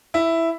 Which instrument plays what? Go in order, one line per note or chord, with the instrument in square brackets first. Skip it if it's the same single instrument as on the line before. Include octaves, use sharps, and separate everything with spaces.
[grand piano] E4